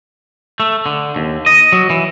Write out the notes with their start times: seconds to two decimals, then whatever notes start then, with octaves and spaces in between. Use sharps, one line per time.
0.60 A3
0.86 D3
1.16 D#2
1.46 D#5
1.72 F#3
1.90 E3